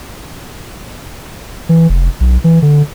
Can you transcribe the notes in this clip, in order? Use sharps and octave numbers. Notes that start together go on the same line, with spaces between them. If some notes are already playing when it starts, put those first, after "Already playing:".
E3
F1
B1
E3
D3